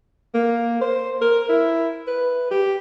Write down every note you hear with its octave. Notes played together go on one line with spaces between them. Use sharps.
A#3
C5
A#4
E4
B4
G4